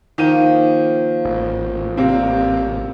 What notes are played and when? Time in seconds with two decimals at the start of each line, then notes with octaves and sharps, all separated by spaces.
0.18 D#3 F3 A#3 F5 D#7
1.25 A1
1.97 C3 G3 A#3 C4